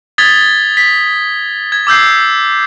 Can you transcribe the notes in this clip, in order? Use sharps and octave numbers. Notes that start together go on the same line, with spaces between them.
D#6 G#6 A6 B6 G7
B6
G#6
D6 E6 G6 C7